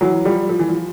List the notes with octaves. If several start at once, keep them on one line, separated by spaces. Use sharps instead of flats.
E3 F#3
F3 G3
F3
E3
F3